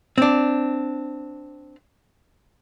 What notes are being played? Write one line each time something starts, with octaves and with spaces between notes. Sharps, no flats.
C4 D4